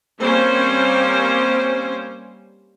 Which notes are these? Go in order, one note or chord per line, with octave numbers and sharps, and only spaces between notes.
G3 A#3 C4 C#4 C5